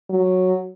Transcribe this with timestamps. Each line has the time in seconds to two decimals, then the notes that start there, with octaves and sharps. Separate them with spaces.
0.10 F#3